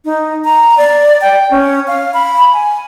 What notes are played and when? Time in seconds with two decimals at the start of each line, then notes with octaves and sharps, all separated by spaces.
0.05 D#4
0.45 A#5
0.78 D5
1.21 G5
1.51 C#4
1.88 F5
2.14 B5
2.53 G#5